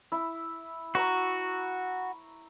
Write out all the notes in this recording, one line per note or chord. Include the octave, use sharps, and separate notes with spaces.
E4
F#4 A#5 B5 C#6